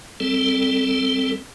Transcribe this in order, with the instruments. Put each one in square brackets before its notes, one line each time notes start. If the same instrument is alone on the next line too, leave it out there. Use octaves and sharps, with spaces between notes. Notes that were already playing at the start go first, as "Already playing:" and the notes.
[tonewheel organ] G3 C4 A4